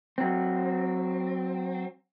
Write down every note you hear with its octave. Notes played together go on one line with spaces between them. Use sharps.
F#3 C4